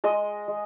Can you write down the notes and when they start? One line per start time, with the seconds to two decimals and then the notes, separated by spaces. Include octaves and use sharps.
0.04 G#3 D#5
0.48 G#3